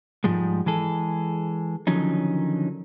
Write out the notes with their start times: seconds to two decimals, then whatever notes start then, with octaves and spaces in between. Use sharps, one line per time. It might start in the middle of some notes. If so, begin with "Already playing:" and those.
0.24 G#2 F3 G3 G#3
0.66 E3 G#3 G#4 A4
1.87 D3 D#3 F3 F#3 C#4 D#4